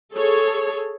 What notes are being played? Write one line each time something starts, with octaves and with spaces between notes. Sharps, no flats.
G#4 A4 C#5